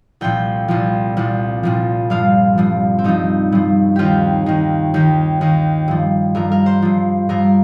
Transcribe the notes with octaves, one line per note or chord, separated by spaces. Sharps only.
C2 A#2 F3 G5
C2 A#2 F3
C2 A#2 F3
C2 A#2 F3
G2 F3 F5
G2 F3
C4
G2 F3 D#4
G2 F3
D#2 D#3 F4 G4
D#2 D#3
D#2 D#3 G4
D#2 D#3
G2 F3
G2 F3 A#4
A#4
C5
G2 F3
G2 F3 A#4